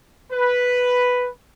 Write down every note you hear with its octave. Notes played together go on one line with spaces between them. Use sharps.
B4